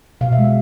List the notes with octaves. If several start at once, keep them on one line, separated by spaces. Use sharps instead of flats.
B2 F5
E5
G#3
E5